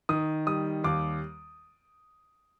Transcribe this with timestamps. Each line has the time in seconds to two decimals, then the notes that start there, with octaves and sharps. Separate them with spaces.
0.09 D#3 D#6
0.47 G3 D#6
0.84 D#2 D6